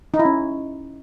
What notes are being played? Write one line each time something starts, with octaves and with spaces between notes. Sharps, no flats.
D#4
E4
C#4